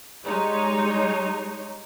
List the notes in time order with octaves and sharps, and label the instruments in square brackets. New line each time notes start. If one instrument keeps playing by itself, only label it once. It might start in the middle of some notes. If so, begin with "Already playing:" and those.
[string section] G3 G#3 D#4 C#5